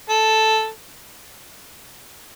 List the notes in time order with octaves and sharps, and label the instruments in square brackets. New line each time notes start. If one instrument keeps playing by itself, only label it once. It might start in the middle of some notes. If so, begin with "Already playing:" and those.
[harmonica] A4